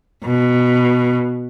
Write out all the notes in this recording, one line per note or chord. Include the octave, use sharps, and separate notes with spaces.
B2